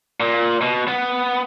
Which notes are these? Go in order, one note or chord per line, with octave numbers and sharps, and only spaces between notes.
A#2
B2
B3